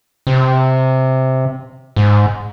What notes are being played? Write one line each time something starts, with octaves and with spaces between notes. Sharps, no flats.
C3
G#2